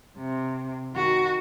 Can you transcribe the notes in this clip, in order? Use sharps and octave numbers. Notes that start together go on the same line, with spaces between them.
C3
D#3 F#4